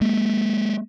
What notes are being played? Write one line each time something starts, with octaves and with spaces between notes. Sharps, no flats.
G#3 A#3